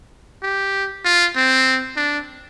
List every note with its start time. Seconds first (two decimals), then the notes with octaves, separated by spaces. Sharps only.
0.43 G4
1.05 F4
1.36 C4
1.97 D4